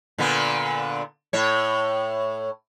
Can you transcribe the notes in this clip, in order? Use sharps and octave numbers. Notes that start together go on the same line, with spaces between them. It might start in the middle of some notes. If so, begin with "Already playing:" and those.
A#2 D3 B3
A2 C#5